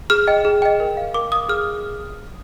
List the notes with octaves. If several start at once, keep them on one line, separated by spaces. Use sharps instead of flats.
G#4 F6
D#5 G5
G#4
D#5 G5
A#4
F5
A#4 D6
F5 D#6
G#4 F6